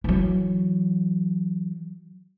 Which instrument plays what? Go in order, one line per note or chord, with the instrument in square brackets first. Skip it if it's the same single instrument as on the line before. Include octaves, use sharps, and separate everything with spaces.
[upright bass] E3 F#3